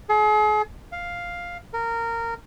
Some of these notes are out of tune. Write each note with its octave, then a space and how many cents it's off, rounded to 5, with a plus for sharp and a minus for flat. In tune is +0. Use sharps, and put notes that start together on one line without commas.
G#4 +40
F5 +5
A#4 -15